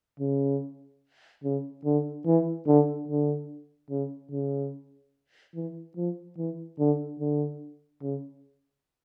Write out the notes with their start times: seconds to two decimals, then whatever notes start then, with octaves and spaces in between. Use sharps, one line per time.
0.20 C#3
1.44 C#3
1.85 D3
2.26 E3
2.67 D3
3.08 D3
3.91 C#3
4.32 C#3
5.55 E3
5.97 F3
6.38 E3
6.79 D3
7.20 D3
8.02 C#3